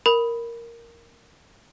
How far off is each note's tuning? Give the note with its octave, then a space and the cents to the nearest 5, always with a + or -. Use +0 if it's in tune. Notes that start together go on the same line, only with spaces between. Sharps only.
A#4 +0 B5 +0